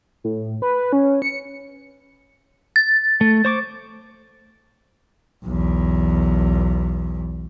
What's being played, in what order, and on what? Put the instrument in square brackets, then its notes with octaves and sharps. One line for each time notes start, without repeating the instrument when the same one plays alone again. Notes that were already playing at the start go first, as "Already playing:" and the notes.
[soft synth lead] A2
B4
C#4
C#7
[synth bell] A6
[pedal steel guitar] A3
C5 C#6 D6
[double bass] B1 E2